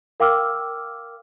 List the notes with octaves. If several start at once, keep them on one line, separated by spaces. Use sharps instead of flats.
A#4 F5 G5 D6 E6 F6